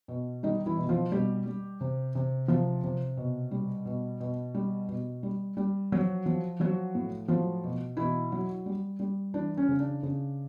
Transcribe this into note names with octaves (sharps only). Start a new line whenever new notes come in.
B2
D#3 G3 D#4
E3 E4
B2
F3 F4
B2 G3 G4
G3
C3
C3
C3 F3 F4
C3
B2
G3
B2
B2
G3
B2
G3
G3
F3 F#3 F#4
F3
F3 F#3 F#4
A2
F3 F#3 F4
B2
B2 E3 E4
F#3
G3
G3
E3 D4
C#4
C#3
D4
C#3